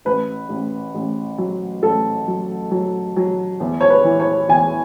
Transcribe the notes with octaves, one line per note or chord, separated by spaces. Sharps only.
A1 B4
A1
A1
F#3
A1 A4
F#3
F#3
F#3
E2
C#5
B4
E3
C#5
E2 G#5